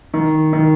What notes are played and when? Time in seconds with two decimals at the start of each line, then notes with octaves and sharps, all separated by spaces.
0.14 D#3
0.53 D#3